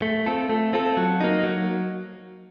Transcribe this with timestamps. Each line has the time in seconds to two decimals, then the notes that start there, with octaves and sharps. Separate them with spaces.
0.02 A3
0.26 C4 F4 A4
0.49 A3
0.73 C4 F4 A4
0.97 F#3
1.20 A#3 D#4
1.43 F#3